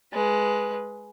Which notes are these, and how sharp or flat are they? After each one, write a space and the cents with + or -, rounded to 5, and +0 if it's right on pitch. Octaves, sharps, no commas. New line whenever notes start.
G#3 +10 B4 +0